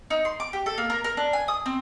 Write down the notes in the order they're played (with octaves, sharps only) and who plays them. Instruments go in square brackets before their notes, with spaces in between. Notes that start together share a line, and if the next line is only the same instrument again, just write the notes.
[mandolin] D#4
C6
D6
G4
A4
A#3
A#4
A#4
D4
G#5
D#6
C4